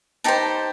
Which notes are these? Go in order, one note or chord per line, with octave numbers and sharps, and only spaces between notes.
D#4 G4 C5 A5 B5